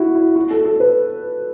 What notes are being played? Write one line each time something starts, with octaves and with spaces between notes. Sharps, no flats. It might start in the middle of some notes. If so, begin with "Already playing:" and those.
Already playing: E4 F#4
E4
F#4
A4
A4
B4